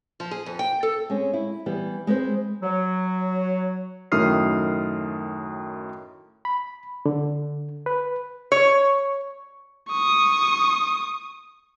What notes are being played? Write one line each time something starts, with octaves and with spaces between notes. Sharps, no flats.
F3
G#4
F2
G5
A4
G#3 C4 C#4
E4
E3 G3 B3
G#3 C4 B4 C5
F#3
F#2 A2 D#3 D#6 F6 C7
B5
D3
B4
C#5
C#6 D#6